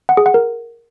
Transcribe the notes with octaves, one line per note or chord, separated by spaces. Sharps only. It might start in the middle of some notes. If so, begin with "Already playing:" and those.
F#5
G#4
F#5
A#4